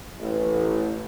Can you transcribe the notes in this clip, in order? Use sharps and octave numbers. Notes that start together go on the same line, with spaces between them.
A1